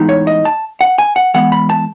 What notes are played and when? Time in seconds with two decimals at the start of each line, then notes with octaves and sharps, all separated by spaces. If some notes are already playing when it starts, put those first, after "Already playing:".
Already playing: A2 E3 G#3 B3 D#4
0.09 C#5
0.27 D#5
0.45 A5
0.81 F#5
0.98 G#5
1.16 F#5
1.34 E3 G#3 B3 F#5
1.52 B5
1.70 A5